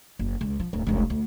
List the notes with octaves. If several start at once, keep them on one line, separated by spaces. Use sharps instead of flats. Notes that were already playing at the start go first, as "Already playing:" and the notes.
F#1
C#2
F3
D1
F1 C#2
D2